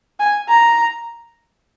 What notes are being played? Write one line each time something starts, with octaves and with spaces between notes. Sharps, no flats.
G#5
A#5